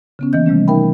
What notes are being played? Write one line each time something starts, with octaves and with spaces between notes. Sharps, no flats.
C#3 B3 C#4
D#3 E3 A#3 D#5 G6
C3 G3 A3 C#4
D#4 A#4 E5 G5 B5